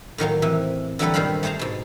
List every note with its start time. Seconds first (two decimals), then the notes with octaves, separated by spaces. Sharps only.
0.18 A2 D#3 F#3 A#3
0.42 C3 E3
0.99 D3 E3 F#3 G3 A4 B4
1.14 G2 A#2 D#3 C5 F5 B5
1.43 A3 G#4 C5 A5 A#5
1.59 G#2 B2